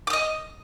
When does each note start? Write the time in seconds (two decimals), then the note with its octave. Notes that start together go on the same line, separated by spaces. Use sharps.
0.07 D6
0.10 D#6
0.13 D#5